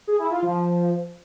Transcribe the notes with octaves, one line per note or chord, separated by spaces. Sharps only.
G#4
E4
F4
F3